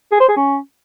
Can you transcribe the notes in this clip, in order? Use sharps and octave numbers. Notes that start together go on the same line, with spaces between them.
G#4
C5
G#4
C#4